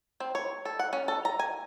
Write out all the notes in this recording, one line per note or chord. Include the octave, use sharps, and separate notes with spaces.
C4
C#5
A4
F#5
C#4
A4
A#5
G#5